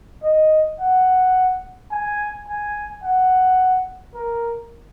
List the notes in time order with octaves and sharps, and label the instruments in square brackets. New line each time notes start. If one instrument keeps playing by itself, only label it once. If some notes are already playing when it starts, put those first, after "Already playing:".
[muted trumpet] D#5
F#5
G#5
G#5
F#5
A#4